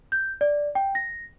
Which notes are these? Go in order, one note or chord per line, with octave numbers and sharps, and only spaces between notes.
G6
D5
G5
A#6